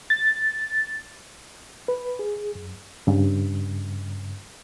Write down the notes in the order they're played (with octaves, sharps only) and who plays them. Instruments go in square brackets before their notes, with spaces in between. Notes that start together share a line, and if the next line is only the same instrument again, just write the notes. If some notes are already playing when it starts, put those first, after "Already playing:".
[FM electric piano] A6
[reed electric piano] B4
G#4
F#2
G2 C#3